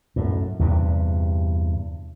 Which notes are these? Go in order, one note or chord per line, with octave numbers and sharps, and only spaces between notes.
F#2 A2
E2 G2 C3